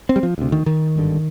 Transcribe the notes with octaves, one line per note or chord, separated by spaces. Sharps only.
C4
G3
F3
D2 C3
D#3
D#3
G#1 G2 D3